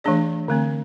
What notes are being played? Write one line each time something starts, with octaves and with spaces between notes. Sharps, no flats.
E3 A3 D4 G#4 D5
D3 A3 C4